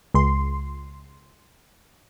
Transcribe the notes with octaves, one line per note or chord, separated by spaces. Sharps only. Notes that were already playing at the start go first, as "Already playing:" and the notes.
C#2 C6